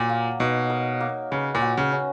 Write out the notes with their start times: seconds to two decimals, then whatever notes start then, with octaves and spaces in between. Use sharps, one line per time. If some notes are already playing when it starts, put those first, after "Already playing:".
Already playing: A#2 F#3
0.09 A#3
0.39 B2 D#4
0.70 A#4
1.00 A#3
1.31 C#3 B4
1.55 A#2
1.62 F#4
1.77 C#3
1.92 C#4